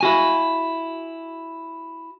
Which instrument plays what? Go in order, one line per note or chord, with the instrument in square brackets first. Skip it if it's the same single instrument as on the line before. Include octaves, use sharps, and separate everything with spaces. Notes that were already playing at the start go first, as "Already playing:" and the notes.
[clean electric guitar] E4 F#4 G#5